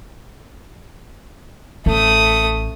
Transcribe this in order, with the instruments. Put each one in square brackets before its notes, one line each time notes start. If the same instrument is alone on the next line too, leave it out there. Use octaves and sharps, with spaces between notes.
[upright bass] A1 [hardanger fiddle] A3 D#6